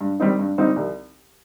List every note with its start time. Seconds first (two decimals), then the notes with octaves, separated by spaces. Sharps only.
0.01 G2
0.20 D#3 G3 C4 D#4
0.39 G2
0.58 D#3 G3 C4 D#4
0.76 C2